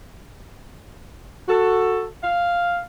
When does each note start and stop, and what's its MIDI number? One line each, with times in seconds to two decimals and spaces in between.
1.49 2.06 66
1.49 2.06 69
2.23 2.81 77